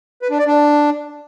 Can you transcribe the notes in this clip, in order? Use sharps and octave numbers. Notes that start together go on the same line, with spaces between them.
B4
D4
D5
D4